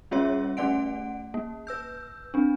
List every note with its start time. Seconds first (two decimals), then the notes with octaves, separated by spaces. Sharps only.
0.11 G3 C#4 F4 G#4 C#5 E5
0.57 A3 C#4 D5 F#5 D7
1.34 A#3
1.67 B4 E6 G6
2.34 C4 D4